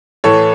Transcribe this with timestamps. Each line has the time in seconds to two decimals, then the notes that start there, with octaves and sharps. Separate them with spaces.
0.24 A2 E3 A4 C#5